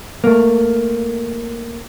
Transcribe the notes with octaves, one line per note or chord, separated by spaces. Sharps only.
A3 A#3